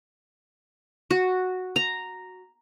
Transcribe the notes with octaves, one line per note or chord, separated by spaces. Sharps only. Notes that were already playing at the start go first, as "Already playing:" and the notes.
F#4
A#5